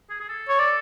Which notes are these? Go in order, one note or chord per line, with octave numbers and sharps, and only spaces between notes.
G#4
G#4
A4
C#5
D5